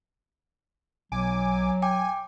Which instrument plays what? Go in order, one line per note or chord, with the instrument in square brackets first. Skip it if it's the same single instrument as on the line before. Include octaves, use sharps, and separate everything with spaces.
[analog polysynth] B1 G#5 D6 [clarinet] F#3
[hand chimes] G5 D6 [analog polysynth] G#5